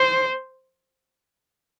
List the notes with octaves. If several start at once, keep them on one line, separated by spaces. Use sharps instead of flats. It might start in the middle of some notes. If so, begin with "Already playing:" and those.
Already playing: C5